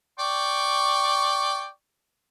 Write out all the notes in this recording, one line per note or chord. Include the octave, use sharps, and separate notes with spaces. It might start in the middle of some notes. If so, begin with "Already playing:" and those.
D5 G5 C#6